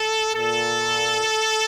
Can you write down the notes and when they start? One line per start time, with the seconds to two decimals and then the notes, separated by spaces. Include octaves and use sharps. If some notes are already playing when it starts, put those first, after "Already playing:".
Already playing: A4
0.35 A#2 A4